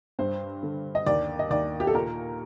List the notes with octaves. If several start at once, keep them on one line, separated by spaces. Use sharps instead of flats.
G2 C5
D3
D#5
D#2 D5
D#5
D#2 D5
G4
A4
A#2 A#4